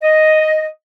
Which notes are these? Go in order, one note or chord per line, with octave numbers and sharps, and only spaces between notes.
D#5